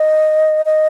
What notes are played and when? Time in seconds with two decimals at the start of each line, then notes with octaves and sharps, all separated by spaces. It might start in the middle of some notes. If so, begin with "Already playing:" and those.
Already playing: D#5
0.66 D#5